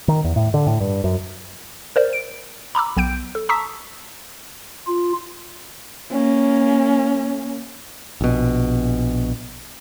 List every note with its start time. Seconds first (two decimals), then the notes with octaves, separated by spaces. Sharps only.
0.08 D#3
0.24 E2
0.36 A2
0.54 D3
0.67 A2
0.81 G2
1.04 F#2
1.96 A#4 C5 D5
2.13 D7
2.75 A#5 B5 D6 E6
2.96 B1 B3 G5 G6 D7
3.35 A4
3.49 A5 A#5 C#6 D#6 E6 B6
4.87 F4
6.11 A#3 C#4
8.21 A#1 B2